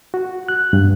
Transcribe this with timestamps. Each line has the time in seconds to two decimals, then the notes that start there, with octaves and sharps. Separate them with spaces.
0.14 F#4
0.48 F#6
0.73 G2